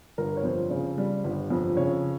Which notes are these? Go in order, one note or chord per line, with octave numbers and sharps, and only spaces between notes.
G1 A#4
C#5
F2 C5
C#3
G3
G1
F2
C#3 C#5